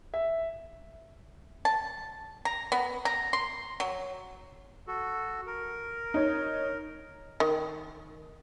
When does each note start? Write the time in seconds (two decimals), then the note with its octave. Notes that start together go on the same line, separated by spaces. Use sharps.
0.14 E5
1.65 A5
2.45 A#5
2.72 B3
3.05 A#5
3.33 C6
3.80 F#3
4.87 F#4 A4
5.47 A#4
6.14 D#4 C#5
7.40 D#3